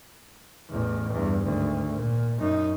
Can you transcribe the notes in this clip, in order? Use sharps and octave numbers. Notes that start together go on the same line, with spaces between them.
A1 E2
E2 G2
G#1 D2
A#2
F#2 D#4